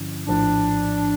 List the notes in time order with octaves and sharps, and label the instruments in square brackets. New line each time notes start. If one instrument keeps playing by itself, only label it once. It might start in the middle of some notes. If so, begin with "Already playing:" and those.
Already playing: [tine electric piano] G2 D3 F3 C#4 E4
[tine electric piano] A#1 A2 F3 [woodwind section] D4